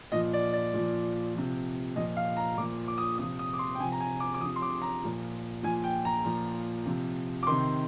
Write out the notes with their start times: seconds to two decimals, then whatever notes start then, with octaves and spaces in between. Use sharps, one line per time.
0.12 A#2 F3 D#5
0.33 D5
0.53 D5
0.74 A#2 F3
1.34 C3 F3
1.96 A#2 F3 D#5
2.17 F5
2.37 A#5
2.58 A#2 F3 D6
2.88 D6
2.98 D#6
3.18 C3 F3 D#6
3.39 D#6
3.53 D6
3.59 C6
3.75 G5
3.79 C3 F3 G#5
3.92 A#5
4.00 G#5
4.20 D6
4.34 D6
4.41 F3 D#6
4.45 C3
4.56 C6
4.62 D6
4.82 A#5
5.03 A#2 F3
5.63 A#2 F3 G#5
5.84 G5
6.05 A#5
6.25 A#2 F3
6.86 C3 F3
7.43 D6
7.47 C3 D#3 C6